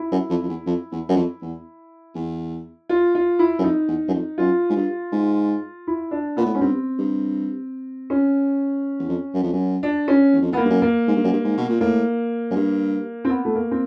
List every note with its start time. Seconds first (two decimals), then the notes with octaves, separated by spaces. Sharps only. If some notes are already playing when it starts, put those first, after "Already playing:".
Already playing: E4
0.11 F#2
0.30 F2
0.43 F2
0.49 E2
0.66 F2
0.92 E2
1.09 F#2
1.16 F2
1.42 E2
2.15 E2
2.89 F4
3.15 F4
3.39 E4
3.59 F#2
3.64 F2 D#4
3.88 E2
4.08 F#2
4.14 F2
4.38 F#2 F4
4.70 G#2
4.76 G2
5.12 G#2
5.87 E4
6.11 D4
6.36 A#2 B3
6.46 A2
6.53 G#2 C#4
6.61 G2 C4
6.99 G2
8.10 C#4
8.99 E2
9.09 F2
9.34 F#2
9.43 F2
9.53 F#2
9.83 D4
10.08 C#4
10.33 E2
10.42 F2
10.51 E2 B3
10.57 A#3
10.65 G2
10.70 F#2
10.82 A#3
11.07 G#2
11.16 G2
11.24 F#2
11.33 G2
11.44 G#2
11.58 B2
11.69 A#2
11.81 A2 A#3
12.51 F#2
12.55 G2
13.25 C4
13.30 B3
13.45 A3
13.55 A#3
13.71 C4